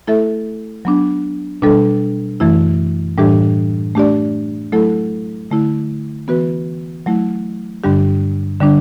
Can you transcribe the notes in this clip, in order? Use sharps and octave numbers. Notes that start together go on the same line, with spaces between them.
A3 E4 A4 E5
F#3 B3 D4
B2 G3 D4 A4
F#2 E3 A3 E4
A2 E3 G3 D4 G4
A3 D4 G4 D5
F#3 A3 E4 A4
D3 A3 E4
E3 B3 F#4 B4
F#3 A3 E4
G2 D3 G3 D4 G4
D3 G3 D4